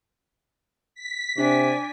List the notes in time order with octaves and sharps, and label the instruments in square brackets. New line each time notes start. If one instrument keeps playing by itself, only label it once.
[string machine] B6
[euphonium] C3 [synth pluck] D4 [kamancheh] D5 G#5